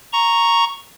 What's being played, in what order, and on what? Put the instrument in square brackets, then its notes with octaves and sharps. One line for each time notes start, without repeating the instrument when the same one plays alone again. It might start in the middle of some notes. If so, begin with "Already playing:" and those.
[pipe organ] A#5 C#6